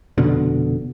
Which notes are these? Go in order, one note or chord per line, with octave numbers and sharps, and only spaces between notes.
F1 B2 D3